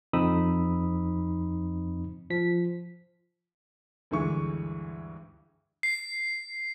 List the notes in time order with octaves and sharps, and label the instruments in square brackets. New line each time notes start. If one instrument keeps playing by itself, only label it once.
[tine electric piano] F2 C4 D#4 B5 D#6 E6
F3 B6
[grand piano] D2 G2 D3 E3 G#3 C#6
[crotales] C7